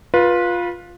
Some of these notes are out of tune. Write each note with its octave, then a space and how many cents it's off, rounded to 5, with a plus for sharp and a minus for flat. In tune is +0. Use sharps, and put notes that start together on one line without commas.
F4 +10 B4 -20